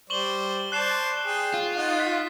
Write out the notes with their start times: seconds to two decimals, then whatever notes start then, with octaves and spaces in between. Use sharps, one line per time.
0.10 G3 C5 D5 C#6 F#7 G7
0.72 C5 D5 A5 F#6 C7 E7
1.25 G#4 G5
1.54 F4
1.75 D#4 F#5
2.00 B6